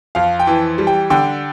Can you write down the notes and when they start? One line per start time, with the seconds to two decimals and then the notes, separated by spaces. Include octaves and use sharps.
0.15 F2 F5
0.40 G5
0.47 E3
0.78 G3
0.87 G5
1.10 D3 G5